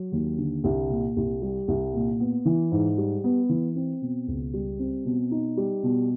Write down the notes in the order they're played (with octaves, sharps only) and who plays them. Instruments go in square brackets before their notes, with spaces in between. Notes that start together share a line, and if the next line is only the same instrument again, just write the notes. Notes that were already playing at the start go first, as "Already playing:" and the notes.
Already playing: [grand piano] F#3
D#2
D3
C2
A#2
C2
G3
C2
A#2
B3
E3
G#2
G3
B3
E3
C4
B2
C#2
G3
C4
B2
D#4
G3
B2